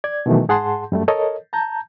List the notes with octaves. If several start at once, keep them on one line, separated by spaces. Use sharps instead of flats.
D5 G#6
B2 D#3 E3 F#3 A3
G#2 G#4 F#5 A5 C6
F#2 G3 A3
A4 A#4 C#5 D#5
A5 A#5 G6